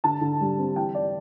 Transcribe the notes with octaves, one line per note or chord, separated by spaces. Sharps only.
D3 A5
D3
G3
C4
E3 G5
E3 D5